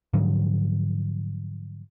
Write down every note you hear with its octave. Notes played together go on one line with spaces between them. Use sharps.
G#2 D3 F3 F#3